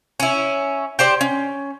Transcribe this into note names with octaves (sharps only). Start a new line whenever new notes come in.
C#4 E4
G4 C5 D5
C#4